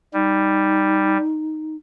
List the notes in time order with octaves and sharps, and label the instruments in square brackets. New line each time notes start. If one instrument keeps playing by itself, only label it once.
[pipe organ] G3 [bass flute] D#4